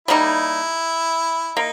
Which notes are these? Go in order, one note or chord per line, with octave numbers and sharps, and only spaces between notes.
G3 A#3 D#4 E4
A#3 D#4